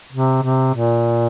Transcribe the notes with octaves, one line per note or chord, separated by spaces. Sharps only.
C3
C3
A#2